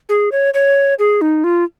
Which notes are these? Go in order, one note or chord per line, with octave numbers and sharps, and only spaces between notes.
G#4
C#5
C#5
G#4
D#4
F4